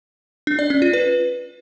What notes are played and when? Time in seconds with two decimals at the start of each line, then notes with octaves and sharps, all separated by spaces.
0.47 D4
0.59 D5
0.70 C#4
0.82 F4
0.93 B4